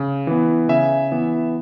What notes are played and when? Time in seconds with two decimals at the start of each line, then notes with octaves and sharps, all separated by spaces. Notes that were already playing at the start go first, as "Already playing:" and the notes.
Already playing: C#3
0.27 E3 B3
0.69 C#3 E5 G#5
1.12 E3 B3